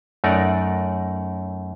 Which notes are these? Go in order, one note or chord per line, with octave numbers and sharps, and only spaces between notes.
F#2 A3 D#4 A#4 D5 F#5